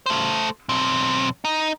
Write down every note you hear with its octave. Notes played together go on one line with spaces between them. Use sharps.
A3 C5
B1 C4
D#4